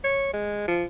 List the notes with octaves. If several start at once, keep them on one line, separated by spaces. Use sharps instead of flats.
C#5
G#3
F3